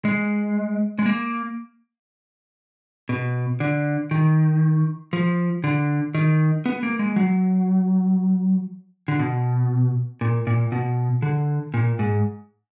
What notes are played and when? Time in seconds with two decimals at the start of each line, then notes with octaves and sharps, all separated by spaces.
0.05 G#3
0.99 G#3
1.06 A#3
3.09 B2
3.60 D3
4.11 D#3
5.13 F3
5.64 D3
6.15 D#3
6.66 B3
6.83 A#3
6.99 G#3
7.16 F#3
9.08 D3
9.19 B2
10.21 A#2
10.47 A#2
10.72 B2
11.22 D3
11.74 A#2
11.99 G#2